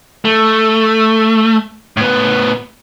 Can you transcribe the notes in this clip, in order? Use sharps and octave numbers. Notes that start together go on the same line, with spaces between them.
A3
A2 B3